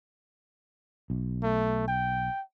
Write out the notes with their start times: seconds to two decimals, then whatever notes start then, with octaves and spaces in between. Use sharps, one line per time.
1.10 B1
1.43 A3
1.88 G5